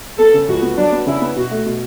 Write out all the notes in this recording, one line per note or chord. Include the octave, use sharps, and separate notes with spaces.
B3 A4
C#3
C#2 F#4
B3
F#3 D4
B3
C#3 E4
B3
B2 F#4
A3
B2